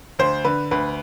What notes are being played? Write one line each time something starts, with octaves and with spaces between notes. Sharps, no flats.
D2 C5
D3 B4
D2 B4